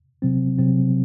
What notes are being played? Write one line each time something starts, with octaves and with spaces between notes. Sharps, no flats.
C3 F#3 C4
C3 F#3 C4